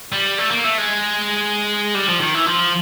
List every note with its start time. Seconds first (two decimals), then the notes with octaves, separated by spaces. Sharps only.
0.12 G3
0.38 A3
0.51 A#3
0.65 A3
0.78 G#3
1.95 G3
2.08 F3
2.20 D#3
2.34 E3
2.46 F3